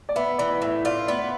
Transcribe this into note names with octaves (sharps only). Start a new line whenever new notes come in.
D5
B3 E5
E3 D5
A2 E5
F4 D5
B3 D5